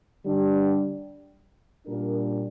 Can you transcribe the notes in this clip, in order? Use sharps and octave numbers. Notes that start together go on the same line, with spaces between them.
D3 G3 D4
A#2 G3 D4 A#4